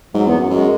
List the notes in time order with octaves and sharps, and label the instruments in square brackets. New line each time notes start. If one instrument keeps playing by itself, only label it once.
[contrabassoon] G#2 [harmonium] F#3
[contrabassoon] E2 [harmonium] B3
[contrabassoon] F#2
[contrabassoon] F#2 [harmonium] G#3